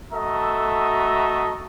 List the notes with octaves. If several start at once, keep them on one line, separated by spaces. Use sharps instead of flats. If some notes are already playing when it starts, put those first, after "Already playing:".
A3 F#4 A4 D#5 E5 A#5